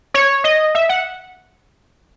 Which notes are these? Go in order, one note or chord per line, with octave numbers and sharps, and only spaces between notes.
C#5
D#5
E5
F#5